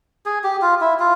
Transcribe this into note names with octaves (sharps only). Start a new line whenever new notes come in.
G#4
G4
F4
E4
F4